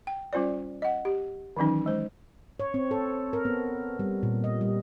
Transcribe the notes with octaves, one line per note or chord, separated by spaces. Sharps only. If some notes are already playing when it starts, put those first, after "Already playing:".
G5
G3 C#4 F4 C5 D5
D#5 F#5
G4
D#3 E3 F#3 C#4 D#4
G#3 C5
C#5
C4
A4
A#4
B3
G3
A#2
D#5
G3